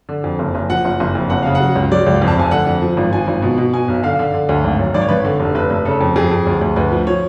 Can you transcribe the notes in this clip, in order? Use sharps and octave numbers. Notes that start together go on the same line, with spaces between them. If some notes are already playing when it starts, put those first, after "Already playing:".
D3
F2
F#1
F#1
F3 F#5
F#1
F#1
F2
F#1 F#5
C#3 F5
F#5
F#3
C#2
F#3 D5
C#2
F2
A5
F1 G#5
D3 F#5
F2
F3
G#1
F3 G#5
G#1
B2
B2
B2 G#5
B1
D3 F5
D3
D3
D2
G#1
F#2
G#1 D5
C#5
G#1 B4
C#5
D3
F1
F1 B4
F1
C#3 A4
F2
F2 G#4
F2
D2
D2
D2 B4
F3
F3 C#5